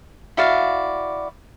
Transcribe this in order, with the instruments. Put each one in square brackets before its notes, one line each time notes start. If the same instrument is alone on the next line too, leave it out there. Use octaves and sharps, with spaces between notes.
[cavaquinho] E4 F#4 D5 F5